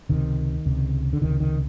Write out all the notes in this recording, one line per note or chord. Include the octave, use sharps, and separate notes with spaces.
C#2 C3 D#3
C#2 C3
D3
C#2 C3 D#3
D#3